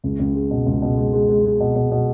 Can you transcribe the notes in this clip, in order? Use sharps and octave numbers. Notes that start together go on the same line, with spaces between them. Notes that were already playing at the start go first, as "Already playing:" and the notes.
C#2
C#2
G#3
B2
C#2
B2
G#3
G#3
G#3
G#3
B2
B2
B2